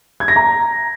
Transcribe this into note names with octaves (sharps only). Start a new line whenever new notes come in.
G#6
A#6
A#5